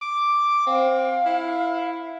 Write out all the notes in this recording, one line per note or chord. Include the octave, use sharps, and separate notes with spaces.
D6
C4 F5
E4